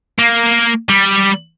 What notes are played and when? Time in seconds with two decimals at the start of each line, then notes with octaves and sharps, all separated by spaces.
0.19 A#3
0.89 G3